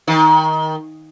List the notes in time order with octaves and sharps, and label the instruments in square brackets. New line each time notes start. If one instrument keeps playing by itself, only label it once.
[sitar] D#3